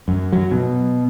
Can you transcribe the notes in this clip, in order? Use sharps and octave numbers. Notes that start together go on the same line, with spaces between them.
F#2
F#3
B2